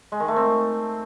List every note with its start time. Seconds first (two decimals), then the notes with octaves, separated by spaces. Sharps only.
0.12 G#3
0.20 D#3
0.28 A3
0.36 C4